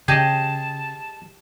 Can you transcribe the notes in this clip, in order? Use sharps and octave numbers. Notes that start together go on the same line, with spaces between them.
C#3 G4 G#4 D#5 A5